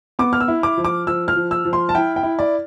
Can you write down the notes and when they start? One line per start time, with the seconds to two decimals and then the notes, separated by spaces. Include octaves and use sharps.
0.19 B3 D6
0.33 F6
0.40 E6
0.48 E4
0.63 D6
0.77 F3
0.85 D6
1.07 F3 E6
1.28 F6
1.36 F3
1.51 E6
1.65 F3
1.73 C6
1.89 A5
1.95 E4 G5
2.16 G5
2.23 E4
2.39 D5